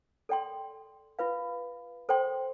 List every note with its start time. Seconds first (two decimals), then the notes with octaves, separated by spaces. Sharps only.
0.29 A4 D5 G5 C6
1.19 F4 B4 F5
2.09 A4 C5 G5 C6